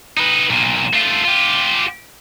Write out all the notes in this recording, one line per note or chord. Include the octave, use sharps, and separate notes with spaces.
D#4 B4
B1 A#2
A3 F4
F4 G4